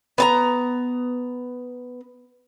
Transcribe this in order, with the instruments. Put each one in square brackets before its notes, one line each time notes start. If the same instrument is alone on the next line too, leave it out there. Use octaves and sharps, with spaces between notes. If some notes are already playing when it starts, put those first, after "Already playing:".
[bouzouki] B3 A5 A#5